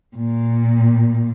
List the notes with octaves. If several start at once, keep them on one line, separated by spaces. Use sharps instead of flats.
A#2